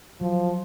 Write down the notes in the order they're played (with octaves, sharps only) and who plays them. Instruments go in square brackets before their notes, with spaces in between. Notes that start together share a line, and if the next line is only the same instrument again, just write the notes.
[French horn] F3 [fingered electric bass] F#3